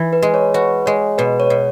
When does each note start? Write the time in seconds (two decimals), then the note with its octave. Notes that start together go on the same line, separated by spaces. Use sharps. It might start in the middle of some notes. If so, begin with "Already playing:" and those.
Already playing: E3
0.13 B4
0.23 G#3
0.34 C#5
0.54 F#4 B4
0.86 G#3 C#5
1.18 B2 B4
1.40 C#5
1.50 B2